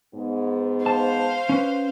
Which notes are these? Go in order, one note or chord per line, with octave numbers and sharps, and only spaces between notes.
G#2 B3
C5 F5 A5
C#4 B4